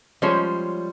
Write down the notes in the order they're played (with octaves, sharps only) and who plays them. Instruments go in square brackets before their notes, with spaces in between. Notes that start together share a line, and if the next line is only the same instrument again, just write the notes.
[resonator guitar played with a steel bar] F3 G3 G#3 C#4 C5 C#5